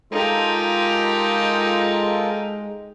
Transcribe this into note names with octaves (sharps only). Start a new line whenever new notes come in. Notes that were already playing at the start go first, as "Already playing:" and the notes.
G#3 D#4 F4 G4 A4 A#4